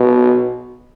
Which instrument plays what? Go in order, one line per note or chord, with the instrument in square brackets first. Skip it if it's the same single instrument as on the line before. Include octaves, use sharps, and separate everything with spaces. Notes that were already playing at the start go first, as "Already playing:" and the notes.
Already playing: [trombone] B2